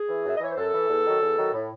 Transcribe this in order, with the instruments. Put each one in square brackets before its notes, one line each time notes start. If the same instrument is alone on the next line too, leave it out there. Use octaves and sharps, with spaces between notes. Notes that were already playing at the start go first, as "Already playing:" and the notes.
Already playing: [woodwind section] G#4
E3
F#2 E5
D#5
E3 C#5
C5
F#2 A4
E3
E2
D#3 F#3
E2
D#3 F#3
A2